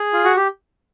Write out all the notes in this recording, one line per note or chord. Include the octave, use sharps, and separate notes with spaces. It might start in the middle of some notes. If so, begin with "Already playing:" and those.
Already playing: G#4
F4
F#4
G4